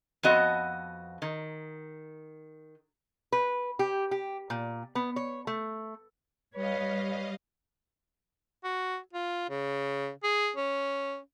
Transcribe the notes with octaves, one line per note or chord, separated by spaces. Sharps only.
F2 B3 F#4 D#5
D#3
B4
G4
G4
A#2
B3
C#5
A3
G3 B4 C#5 D#5 F5
F#4
F4
C#3
G#4
C#4